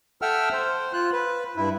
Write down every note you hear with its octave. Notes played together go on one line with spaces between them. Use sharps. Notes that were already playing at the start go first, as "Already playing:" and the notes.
A4 E5 F#5 G5 E6 F6
C5
F4 F#6
B4
G2 E4